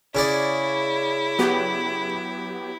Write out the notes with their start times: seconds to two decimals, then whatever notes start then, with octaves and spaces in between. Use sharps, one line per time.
0.15 C#3 E4 G#4 D5
1.39 F#3 B3 G4